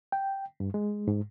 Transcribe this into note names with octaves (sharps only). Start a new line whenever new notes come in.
G5
G2
G#3
G#2